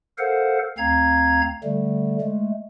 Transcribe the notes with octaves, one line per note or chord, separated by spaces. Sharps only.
A4 A#4 C5 F5 F#5
D2 C4 F5 A#5 G#6
D3 G3 A3
G#3 A3